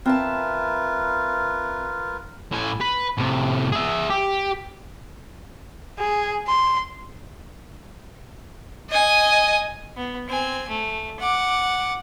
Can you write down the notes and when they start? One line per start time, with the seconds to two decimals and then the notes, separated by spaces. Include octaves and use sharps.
0.06 C4 F4 A#4 B4 E5 A5
2.52 A2 G#5
2.81 B4
3.18 A2 C3
3.72 G#4 E5
4.10 G4
5.99 G#4
6.47 C6
8.90 D#5 G#5
9.96 B3
10.27 C4 G#5
10.69 A3
11.19 F#5 D6